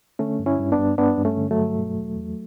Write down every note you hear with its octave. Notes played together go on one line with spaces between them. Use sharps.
D3 A3 C#4
G2
C#4 E4
G2
B3 D4
G2
G2 B3 D4
G2
A3 C#4
D3
F#3 A3
G2
B2
E2
E2